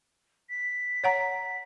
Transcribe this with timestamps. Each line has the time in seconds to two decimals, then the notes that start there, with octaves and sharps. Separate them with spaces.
0.50 B6
1.04 C#5 F#5 A#5